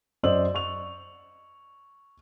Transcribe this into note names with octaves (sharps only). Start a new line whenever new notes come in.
F#2 C5 D5 D#5 E6 F#7
C#6 F7